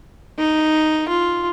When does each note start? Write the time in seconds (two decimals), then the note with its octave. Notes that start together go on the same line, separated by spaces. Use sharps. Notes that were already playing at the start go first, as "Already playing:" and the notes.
0.38 D#4
1.08 F4